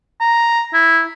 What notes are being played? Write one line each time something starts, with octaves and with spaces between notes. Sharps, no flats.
A#5
E4